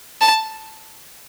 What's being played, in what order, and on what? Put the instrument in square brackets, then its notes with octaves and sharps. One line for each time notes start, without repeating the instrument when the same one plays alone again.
[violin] A5